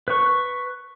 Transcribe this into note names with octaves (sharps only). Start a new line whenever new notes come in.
B4 C#6